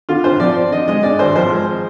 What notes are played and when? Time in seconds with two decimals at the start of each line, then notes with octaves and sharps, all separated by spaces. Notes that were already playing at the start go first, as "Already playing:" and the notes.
0.09 D3 F4
0.24 G2 C5
0.40 F3 D5
0.56 C4
0.71 D3 D#5
0.88 G#3 D#5
1.03 G2 D5
1.19 G#1 C5
1.35 F3 C5
1.50 G#3